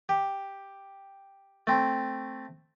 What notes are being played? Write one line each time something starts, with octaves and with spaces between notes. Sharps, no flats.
G4
A3 C4